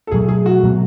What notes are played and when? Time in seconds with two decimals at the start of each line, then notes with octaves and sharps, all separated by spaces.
0.07 A4
0.12 B2 F#3 A3 G#4
0.29 G#4
0.46 F#4
0.63 B2 F#3 A3